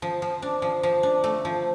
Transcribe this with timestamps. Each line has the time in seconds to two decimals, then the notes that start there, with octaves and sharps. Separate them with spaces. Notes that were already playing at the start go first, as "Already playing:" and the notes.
0.02 F3
0.22 F3
0.42 D4
0.62 F3
0.83 F3
1.03 D4
1.24 A3
1.45 F3